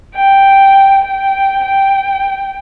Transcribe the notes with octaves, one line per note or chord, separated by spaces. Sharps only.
G5
G5
G5